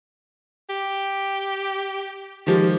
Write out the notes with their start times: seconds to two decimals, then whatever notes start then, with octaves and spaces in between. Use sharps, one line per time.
0.70 G4
2.47 D#3 F3 G#3 G4